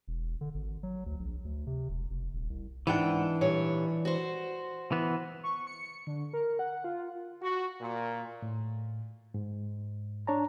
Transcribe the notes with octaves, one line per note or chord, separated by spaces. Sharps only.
E1
D3
G#1
F#3
D2
A#1
D2
C3
E1
F1
D#1
C2
G#2 E3 D4 F#5 G5
A#2 G3 C#5
F#4 C5
E3 B3
C#6
C#7
D3
A#4
F#5
F4
F#4
A#2
A2
G#2
D4 C#5 A5 A#5